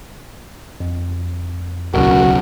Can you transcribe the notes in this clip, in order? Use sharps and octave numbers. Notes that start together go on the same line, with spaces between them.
F2
D1 B1 C#3 F#4 A#4